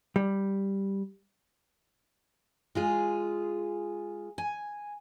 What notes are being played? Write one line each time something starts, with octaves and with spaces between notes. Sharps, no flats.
G3
G#3 F4 G#4
G#5